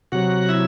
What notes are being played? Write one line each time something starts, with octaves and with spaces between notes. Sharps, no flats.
C3 F#3 F#4 F#5
E4 E5